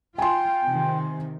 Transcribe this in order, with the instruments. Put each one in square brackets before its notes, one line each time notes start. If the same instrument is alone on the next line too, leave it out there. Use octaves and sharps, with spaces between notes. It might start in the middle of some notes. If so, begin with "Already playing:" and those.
[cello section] F4 [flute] G5 [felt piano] G#5 C6
[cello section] C3 D#3